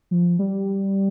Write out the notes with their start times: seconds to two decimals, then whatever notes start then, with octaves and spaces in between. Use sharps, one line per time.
0.11 F3
0.39 G3